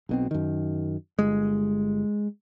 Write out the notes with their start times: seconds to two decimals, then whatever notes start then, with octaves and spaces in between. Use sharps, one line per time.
0.09 B1 B2 C4
0.31 F#2 D#3
1.19 G1 G#3